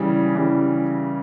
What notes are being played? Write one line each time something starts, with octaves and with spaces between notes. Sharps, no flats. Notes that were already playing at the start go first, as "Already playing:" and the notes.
Already playing: C#3 E3 G3
C#3 E3 G3